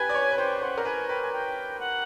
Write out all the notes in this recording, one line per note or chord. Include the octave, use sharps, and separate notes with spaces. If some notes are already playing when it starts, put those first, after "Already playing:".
Already playing: G4 B4 G#5
D5
C#5
B4
C5 G5
C5 F#5
A#4
B4 G#5
B4 G5
G#5
G5
F#5